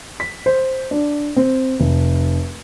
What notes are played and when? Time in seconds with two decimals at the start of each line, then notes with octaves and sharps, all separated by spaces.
0.20 B6
0.46 C5
0.91 D4
1.36 C4
1.80 F1